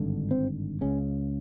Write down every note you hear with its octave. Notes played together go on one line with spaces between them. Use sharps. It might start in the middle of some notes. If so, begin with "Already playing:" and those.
Already playing: G#1 G2 D3
C4
C#2 C#3 C#4